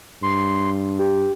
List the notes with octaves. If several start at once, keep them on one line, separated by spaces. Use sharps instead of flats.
G2 C6
G4